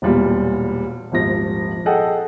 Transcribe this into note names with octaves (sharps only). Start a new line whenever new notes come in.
E1 E2 A#2 G3 F4
D#1 G#1 F3 A#6
G#4 A4 D#5 F#5 G5